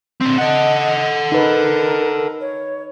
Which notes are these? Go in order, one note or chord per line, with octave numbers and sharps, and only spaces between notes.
D3 C4
A4 D#5 F#5
D#4 A#4 B4
C#5